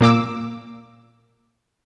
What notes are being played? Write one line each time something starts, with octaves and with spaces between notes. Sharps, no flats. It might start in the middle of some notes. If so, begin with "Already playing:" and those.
A#2 A#3 D6 E6